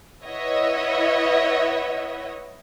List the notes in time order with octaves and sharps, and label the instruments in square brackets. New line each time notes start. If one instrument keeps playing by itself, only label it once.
[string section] E4 B4 C#5 D#5 E5 F#5